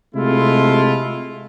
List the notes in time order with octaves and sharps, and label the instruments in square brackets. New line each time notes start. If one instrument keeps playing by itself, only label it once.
[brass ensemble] C3 G#3 A3 E4 F4